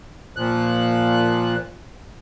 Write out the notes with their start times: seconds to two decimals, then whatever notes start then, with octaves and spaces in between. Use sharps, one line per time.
0.37 A#2 F3 F#6